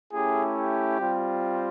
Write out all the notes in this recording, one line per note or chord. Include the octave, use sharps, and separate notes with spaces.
A3 C#4 E4 G4 G#4
G4
G3 C4 F4